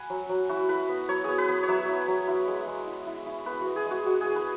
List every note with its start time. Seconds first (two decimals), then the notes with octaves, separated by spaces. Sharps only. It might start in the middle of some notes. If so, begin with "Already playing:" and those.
Already playing: F#5 G#5 B5
0.10 F#3
0.29 F#3
0.49 E4 F#4
0.69 E4 B4
0.89 B3
1.09 F#3 C#5
1.24 B3 G#4
1.38 B4
1.48 B3
1.63 C#5
1.68 F#3 E5
1.88 E4
2.08 F#3
2.27 E4
2.47 G#3
2.67 G#3
2.87 E4
3.07 E4
3.26 E4
3.46 B3 B4
3.61 B3 F#4
3.76 G#4
3.86 G#3
3.91 F#4
4.06 G#3 F#4
4.21 B3 G#4
4.36 B4